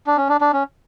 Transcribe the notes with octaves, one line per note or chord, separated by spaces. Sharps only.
D4
C#4
D4
D4
C#4